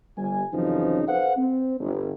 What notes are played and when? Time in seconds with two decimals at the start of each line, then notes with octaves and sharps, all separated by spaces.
0.17 G1 G3 G#5
0.53 F#2 C#3 E3 F3 C4 D#4
1.07 A4 B4 C5 F5 F#5
1.37 C4
1.80 G1